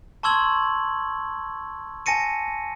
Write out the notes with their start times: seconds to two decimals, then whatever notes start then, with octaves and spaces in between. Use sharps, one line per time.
0.23 A5 C6 C#6 E6 G#6 F#7
2.06 G#5 A5 A#6 C#7 D#7